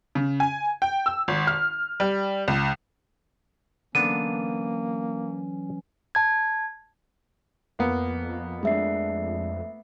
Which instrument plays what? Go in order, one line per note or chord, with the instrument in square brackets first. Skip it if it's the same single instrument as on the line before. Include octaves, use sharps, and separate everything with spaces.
[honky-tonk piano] C#3
G#5
G5
E6
G#1
F6
G3
C#2
[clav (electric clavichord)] D3 B3 D4 [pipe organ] E3 F#3 C#4 [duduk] A#3 [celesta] D#7
[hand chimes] A5 G#6
[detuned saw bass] F2 [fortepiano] A#3 B3
[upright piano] G#3 D4 [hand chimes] A3 E5 C7